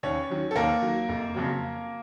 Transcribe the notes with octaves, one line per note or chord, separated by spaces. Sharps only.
D#2 C#4 C#5
D#3 F#3
A4
D#2 A#3 A#4
D#3 F#3
F1
F2 C#3 F#3